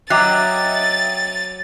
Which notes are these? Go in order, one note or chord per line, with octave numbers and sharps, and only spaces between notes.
F#3 D#5 E5 G5 A#5 D6 F#6 A6